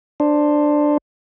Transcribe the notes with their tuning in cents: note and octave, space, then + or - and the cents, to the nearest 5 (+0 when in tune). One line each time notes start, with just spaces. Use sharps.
D4 +10 C5 +5